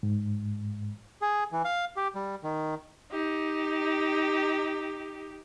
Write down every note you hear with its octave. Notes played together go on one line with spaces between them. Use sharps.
G#2
G#4
E3
F5
G4
G3
D#3
D#4 G4